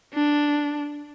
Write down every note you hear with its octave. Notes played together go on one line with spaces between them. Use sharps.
D4